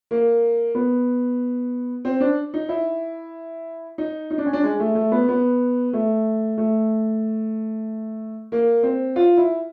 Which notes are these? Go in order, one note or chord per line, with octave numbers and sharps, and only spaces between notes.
A#3
B3
C4
D4
D#4
E4
D#4
D#4
D4
C#4
D4
G#3
A3
A3
B3
B3
A3
A3
A#3
C4
F4
E4